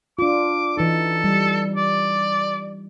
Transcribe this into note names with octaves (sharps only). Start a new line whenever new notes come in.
D4 F4 D6
E3 D#4 A4
G3
D5